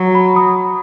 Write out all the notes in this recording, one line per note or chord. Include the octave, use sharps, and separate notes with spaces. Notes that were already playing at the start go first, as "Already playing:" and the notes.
Already playing: F#3 A#5
B5
D#6